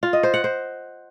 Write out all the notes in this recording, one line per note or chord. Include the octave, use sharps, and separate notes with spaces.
F4
D#5
C5
F#5
C5